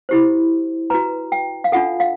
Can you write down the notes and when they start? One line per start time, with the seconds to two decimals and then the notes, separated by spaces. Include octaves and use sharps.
0.09 E4 G4 C5
0.90 F#4 B4 A#5
1.32 G5
1.64 F5
1.72 D4 F4 A4 F#5
2.00 F5